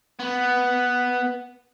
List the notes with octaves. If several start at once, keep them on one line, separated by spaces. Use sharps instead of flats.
B3